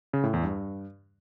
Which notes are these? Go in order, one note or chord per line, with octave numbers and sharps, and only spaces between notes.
C#3
A2
E2
G2